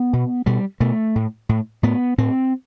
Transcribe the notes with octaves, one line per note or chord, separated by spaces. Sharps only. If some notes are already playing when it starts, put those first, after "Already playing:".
Already playing: B3
B2
B2 G3
B2 A3
A2
A2
A2 B3
A2 C4